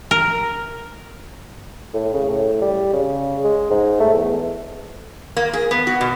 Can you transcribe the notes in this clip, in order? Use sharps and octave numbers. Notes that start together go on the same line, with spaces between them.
A#4
A2
C#3
A2
G3
C#3
G#3
G#2
A3
E2
A#3
G#4
B3
F#4
B2